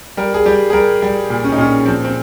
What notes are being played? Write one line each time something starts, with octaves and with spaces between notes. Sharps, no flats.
G3 A#4
G#4
G3 G4
G#4
G3 A#4
G3
A#2
C#4
D#4
A#2 C#4
F3 C4
C4